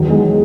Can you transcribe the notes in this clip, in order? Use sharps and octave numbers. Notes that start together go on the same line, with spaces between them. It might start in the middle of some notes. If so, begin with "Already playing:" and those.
Already playing: E2 D#3 F#3
G#3